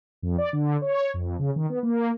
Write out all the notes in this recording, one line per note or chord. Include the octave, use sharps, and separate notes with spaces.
F2
D5
D3
C#5
F2
C#3
D#3
B3
A#3